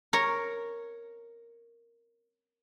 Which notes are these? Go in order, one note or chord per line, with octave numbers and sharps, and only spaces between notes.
A#4 C#5